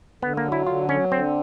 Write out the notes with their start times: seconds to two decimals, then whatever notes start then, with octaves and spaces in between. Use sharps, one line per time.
0.22 D3 B3
0.37 A#3
0.45 F#3
0.52 E4
0.66 D3 F4
0.89 F#3 C#4
1.12 D3 C4